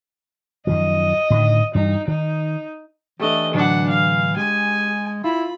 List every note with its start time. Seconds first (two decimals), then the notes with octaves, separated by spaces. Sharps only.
0.67 F#2 D#3 F3 D#5
1.30 A2 D3 D#3
1.75 G2 E3 G3 D#4
2.08 D#3 D#4
3.20 E3 A3 D4 G4 D#5
3.54 A2 D3 F#3 D4 F#5
3.89 F5
4.37 G#3 G4 G#5
5.24 E4 F4 B5